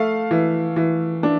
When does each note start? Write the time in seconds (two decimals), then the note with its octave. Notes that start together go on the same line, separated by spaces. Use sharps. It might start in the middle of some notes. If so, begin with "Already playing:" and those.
Already playing: A3 F5
0.31 E3
0.76 E3
1.23 D4